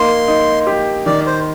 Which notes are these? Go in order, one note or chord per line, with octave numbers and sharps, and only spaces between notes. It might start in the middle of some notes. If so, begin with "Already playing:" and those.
Already playing: A#3 D#4 C6
D#4
G4
D#3 D5
C5